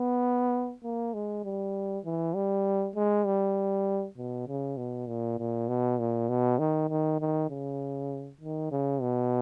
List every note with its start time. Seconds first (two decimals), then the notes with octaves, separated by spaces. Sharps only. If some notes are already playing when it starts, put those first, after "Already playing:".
Already playing: B3
0.84 A#3
1.14 G#3
1.44 G3
2.05 E3
2.35 G3
2.96 G#3
3.26 G3
4.17 B2
4.48 C#3
4.77 B2
5.08 A#2
5.39 A#2
5.69 B2
5.99 A#2
6.29 B2
6.59 D#3
6.89 D#3
7.20 D#3
7.50 C#3
8.41 D#3
8.71 C#3
9.01 B2